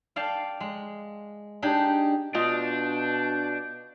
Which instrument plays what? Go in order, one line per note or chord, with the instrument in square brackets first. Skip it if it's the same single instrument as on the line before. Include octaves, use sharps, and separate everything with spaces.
[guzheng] D5 F5 G5 A5
G#3
D4 D#4 G4 G#4
[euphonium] B2 [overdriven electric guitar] D4 [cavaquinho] F4 D#5 [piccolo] G6